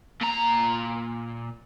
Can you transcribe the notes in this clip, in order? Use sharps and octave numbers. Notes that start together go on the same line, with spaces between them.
A#2 A#5